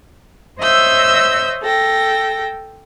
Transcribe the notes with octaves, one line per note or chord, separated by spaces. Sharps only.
C5 C#5 D#5 E5 E6 G6
A4 G5 A#6